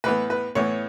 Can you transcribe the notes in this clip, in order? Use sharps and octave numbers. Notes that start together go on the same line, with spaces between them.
A2 E3 B3 B4
B4
A2 E3 B3 C#5